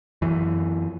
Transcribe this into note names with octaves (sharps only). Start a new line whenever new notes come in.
F#2 E3